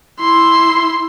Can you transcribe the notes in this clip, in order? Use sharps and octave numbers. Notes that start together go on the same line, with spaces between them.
E4 C6